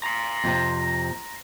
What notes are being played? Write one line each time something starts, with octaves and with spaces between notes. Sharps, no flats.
A#5 C6
F2 C3